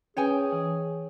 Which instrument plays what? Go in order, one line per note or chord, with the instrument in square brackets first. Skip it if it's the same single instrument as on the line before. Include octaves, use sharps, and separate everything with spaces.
[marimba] C#4 B4 [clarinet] G#4 [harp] C#5 G5 G#5
[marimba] E3